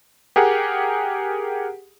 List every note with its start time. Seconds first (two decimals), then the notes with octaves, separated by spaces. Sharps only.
0.36 G4 G#4 A#4 F#5